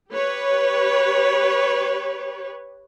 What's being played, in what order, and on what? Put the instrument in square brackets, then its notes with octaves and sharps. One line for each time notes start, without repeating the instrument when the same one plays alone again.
[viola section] G4 B4 C#5